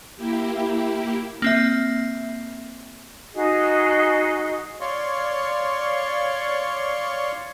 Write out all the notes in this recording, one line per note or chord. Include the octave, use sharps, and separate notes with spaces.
A#3 E4 G4
A#3 C4 E5
D#4 F#4 G#4 D#5
C#5 D5 F5 C6 C#6